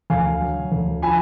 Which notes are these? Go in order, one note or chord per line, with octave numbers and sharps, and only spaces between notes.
D2 F5 G#5
F#3
D2
F3 G#5 B5